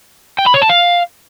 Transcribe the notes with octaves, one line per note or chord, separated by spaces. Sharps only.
G5
B5
C#5
A5
F5